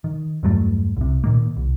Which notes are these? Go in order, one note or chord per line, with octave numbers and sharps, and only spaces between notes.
D#3
E2 G2 F#3 A3
C2 C3
A#2 D#3 A#3
C2